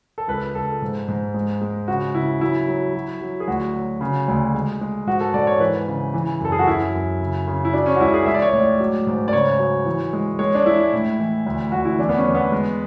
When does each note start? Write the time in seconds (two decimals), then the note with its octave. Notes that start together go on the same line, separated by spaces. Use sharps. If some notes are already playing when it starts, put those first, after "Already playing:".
0.18 A4
0.28 C#2 B4
0.55 C#2 A4
0.82 G#2
1.08 G#2
1.34 G#3
1.61 G#3
1.88 C#3 F#4
2.14 C#3 E4
2.41 F#3 E4
2.68 F#3
2.94 F#3
3.21 F#3
3.40 G#4
3.47 D2 F#4
3.74 F#3
4.01 C#3
4.28 D2
4.55 G#3
4.81 G#3
5.07 G#2 F#4
5.20 A4
5.34 G#2 D5
5.47 C#5
5.60 E3 B4
5.88 C#3
6.14 E3
6.40 F#2 A4
6.52 G#4
6.59 F#4
6.67 F#2 E4
6.93 F#2
7.20 C#3
7.47 C#3
7.65 E4
7.73 F#3 D4
7.86 C#4
7.96 F#4
7.99 C#2 E4
8.14 G#4
8.26 G#3 E5
8.34 D5
8.42 C#5
8.49 A2 D5
8.79 F#3
9.07 G#2
9.28 D5
9.33 C#3 C#5
9.59 F#3
9.86 E3
10.13 G#3
10.39 G#3 C#5
10.55 D4
10.66 G#3 E4
10.93 A2
11.20 E3
11.46 D2
11.72 D2 F#4
11.85 E4
11.98 E2 D4
12.09 B3
12.17 C#4
12.26 E2
12.35 B3
12.52 G#3